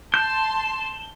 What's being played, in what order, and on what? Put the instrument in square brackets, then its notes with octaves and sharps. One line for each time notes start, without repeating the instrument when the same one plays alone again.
[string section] A5 C6 [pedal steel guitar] G6 [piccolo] E7